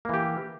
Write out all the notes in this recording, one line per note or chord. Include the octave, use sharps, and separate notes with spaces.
E3 A#3 G4